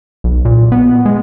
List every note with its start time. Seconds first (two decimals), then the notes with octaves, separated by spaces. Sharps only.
0.24 B1
0.45 A#2
0.72 B3
1.05 G#3